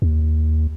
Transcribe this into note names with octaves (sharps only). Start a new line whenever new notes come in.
D#2